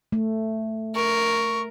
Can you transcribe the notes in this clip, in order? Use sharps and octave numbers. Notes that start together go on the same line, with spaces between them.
A3
A#4 C#6